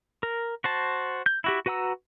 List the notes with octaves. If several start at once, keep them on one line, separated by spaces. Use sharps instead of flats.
A#4
F#4 C5 A5
G6
E4 F#4 G4
F#4 B4 F#5 A#5 E6